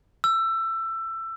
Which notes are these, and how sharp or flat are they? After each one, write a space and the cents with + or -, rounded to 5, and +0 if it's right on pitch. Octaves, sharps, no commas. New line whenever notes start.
E6 +20